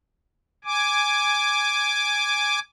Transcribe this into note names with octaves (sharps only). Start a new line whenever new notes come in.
G#5 D6